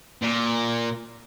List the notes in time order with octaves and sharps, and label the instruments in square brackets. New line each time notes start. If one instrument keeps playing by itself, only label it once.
[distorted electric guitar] A#2